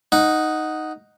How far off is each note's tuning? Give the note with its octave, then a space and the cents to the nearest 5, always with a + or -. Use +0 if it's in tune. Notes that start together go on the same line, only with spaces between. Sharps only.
D#4 +0 F#5 +0